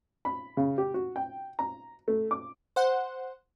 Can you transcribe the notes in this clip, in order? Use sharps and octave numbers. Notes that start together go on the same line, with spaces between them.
B5
C#3
G4
F#4
G5
A#5
A3
D6
C5 F#5